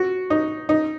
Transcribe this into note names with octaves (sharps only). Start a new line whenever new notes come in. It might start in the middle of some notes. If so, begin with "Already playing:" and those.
Already playing: F#4
D#4
D#4